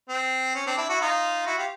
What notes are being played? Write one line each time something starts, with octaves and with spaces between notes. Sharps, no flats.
C4
C#4
C4 D4
D4 E4
E4 F#4
D#4 F4
E4 F#4
F4 G4